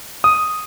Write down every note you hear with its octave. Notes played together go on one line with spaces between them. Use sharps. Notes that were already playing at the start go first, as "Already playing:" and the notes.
D#6